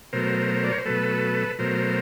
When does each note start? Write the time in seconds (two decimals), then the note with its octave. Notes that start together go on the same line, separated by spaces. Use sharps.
0.13 B2 F#3 A3 A#4 C5
0.64 D5
0.72 C#5
0.78 C5
0.85 B2 F#3 A3 A4 B4
1.59 B2 F#3 A3 A#4 C5